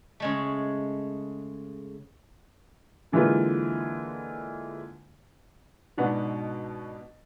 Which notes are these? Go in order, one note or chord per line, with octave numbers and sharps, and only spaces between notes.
C#3 G#3 A3
D3 E3 G#3 A#3 F4 B4
G#2 B2 B3 D4 F#4